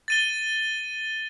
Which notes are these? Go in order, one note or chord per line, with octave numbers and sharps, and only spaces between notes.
A6 D#7 G7